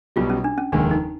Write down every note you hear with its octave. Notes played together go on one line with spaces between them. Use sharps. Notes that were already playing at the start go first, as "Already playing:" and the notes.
B1 B2 G3 F4
C#4
D4
C#4
F1 D#2 D#3 G#3 D4
D#4